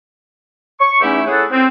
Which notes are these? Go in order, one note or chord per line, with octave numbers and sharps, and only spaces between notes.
C#6
E2 A3 C#4 D#4 E4 G4
C#4 E4 G#4 A4 B4 F#5
C4